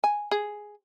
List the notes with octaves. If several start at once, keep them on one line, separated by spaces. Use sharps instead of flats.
G#5
G#4